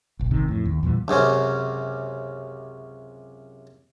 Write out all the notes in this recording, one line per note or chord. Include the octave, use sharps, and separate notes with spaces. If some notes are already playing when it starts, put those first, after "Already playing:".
F#1 B1
G1 D2 C3 D#3
F2 A2
D#2
E2 A#2 E3 G3
C#2 F#2 C3 C#4